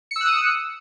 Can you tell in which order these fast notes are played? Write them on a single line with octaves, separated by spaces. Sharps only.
C#7 E6 F#6 D#6